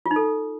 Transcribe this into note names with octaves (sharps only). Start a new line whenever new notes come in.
F4
D#4
A4